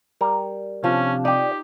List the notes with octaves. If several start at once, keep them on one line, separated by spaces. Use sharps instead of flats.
G3 A#4
C3 F3 C#4 D4
D#4 G4 D5 G5